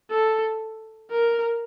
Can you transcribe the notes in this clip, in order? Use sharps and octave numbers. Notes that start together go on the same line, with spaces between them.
A4
A#4